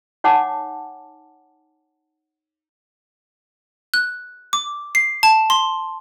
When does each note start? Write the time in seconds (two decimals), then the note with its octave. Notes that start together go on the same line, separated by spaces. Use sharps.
0.24 D#4 C#5 F#5 G#5 A5 D6
3.94 F#6
4.53 D6
4.95 C7
5.23 A5
5.50 C6